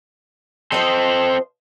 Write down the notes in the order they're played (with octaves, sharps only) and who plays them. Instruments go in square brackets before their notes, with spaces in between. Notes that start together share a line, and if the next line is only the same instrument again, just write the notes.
[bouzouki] F3 C5 D#5 [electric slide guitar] C4 A4